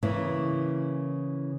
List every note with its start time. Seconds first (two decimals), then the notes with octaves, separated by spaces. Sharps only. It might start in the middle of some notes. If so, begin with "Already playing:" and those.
0.03 C#3 E3 A#3 C#4 E4